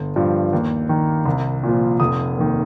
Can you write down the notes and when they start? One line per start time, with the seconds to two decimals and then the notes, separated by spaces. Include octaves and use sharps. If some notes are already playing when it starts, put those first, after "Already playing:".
Already playing: G1
0.16 G2 F3
0.53 D#2
0.89 D#3
1.26 C2
1.63 A#2 F3
2.00 F1 D#6
2.37 D#2 D#3